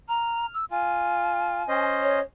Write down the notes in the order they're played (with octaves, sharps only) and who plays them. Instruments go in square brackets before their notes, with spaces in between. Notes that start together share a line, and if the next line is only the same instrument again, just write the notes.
[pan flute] A#5 [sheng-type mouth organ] F6
[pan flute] E6
[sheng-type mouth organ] F4 [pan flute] G#5
[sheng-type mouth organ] C#4 C5 D#5
[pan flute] C#5